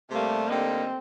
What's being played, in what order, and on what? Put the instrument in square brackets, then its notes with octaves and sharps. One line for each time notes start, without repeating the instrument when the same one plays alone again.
[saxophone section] C3 G3 A#3 [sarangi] A3
[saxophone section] D3 G3 A#3 D#4 [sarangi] C4